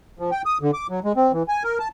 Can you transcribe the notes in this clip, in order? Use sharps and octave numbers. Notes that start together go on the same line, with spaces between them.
F3
G5
D#6
D3
D6
F#3
G#3
C4
E3
G#5
A#4
A5